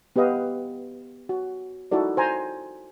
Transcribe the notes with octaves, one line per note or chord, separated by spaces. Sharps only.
B3 G4 B4 D#5 F5
F#4
D#4 E4 F#4 A4 D5
C5 G#5 A#5